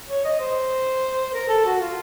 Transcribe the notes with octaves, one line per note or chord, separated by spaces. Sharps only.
C#5
D#5
C5
A#4
A4
F#4
F4